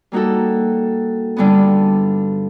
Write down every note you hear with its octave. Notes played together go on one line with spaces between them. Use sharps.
G3 A#3 D#4 F#4 A4
G2 D3 G3 B3